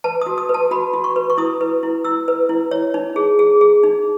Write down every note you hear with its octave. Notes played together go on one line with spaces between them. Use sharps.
B4 A5
F#4 D#6
D#6
B4
A5
F#4 B5
F#4
C#6
B4
C#6
E4 D#6
B4
E4
E4 E6
B4
E4
C#5
D#4
G#4
G#4
G#4
D#4